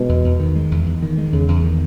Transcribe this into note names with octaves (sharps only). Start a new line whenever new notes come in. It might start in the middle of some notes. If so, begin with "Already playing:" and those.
Already playing: B2 G#3
E2
E2
D#3
G#3
E2
E2
D#3
G#3
E2 C#3
E2
D#3